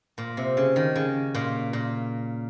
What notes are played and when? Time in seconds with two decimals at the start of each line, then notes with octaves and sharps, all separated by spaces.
0.18 A#2
0.37 C3
0.57 C#3
0.76 D#3
0.96 C#3
1.35 A#2
1.73 A#2